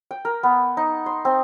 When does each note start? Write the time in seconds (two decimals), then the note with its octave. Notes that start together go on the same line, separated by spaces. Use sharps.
0.11 G5
0.25 A#4
0.43 B3
0.77 D#4
1.06 C6
1.25 C4